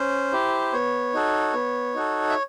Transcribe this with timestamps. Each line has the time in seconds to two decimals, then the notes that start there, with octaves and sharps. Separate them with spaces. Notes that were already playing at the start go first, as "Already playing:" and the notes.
Already playing: C#4 C5
0.32 E4 G4
0.73 B3 C#5
1.13 D#4 F#4 A4
1.54 B3
1.94 D#4 F#4 A4
2.30 E5